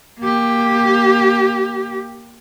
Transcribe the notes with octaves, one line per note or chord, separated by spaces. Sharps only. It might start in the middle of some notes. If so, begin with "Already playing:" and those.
A#3 G4